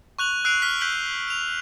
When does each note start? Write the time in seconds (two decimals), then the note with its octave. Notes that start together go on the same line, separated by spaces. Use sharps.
0.19 C#6 F#6 F7 F#7
0.44 E6 F#6 C7 D7 F7
0.62 F6 B6
0.81 F#6 G6 B6 D7 F#7 G7
1.28 D7 F7